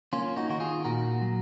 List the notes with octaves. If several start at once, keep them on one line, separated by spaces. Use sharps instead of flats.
A#3 C#4 F4
D#4 F#4
D#3 F#4
F4 G#4
A#2 F#4 A#4
F#3